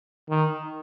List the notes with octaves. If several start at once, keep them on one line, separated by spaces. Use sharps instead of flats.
D#3